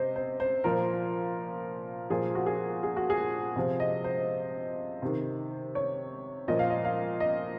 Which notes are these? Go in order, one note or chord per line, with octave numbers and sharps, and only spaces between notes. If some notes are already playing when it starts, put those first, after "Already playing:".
Already playing: C3 C5 D#5
C5
C5
A#2 F3 A#4
A#2 F3 G#4
F#4
G#4
G#4
F#4
G#4
C3 F3
D#5
C5
C3 D#3
C#5
A#2 F3 D#5
F5
D#5
F5
D#5